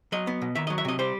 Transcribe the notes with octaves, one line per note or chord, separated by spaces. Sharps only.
F#3 D#5
B3
B2
D#3 E5
F#3 D#5
E5
C3 D#5
G3 C5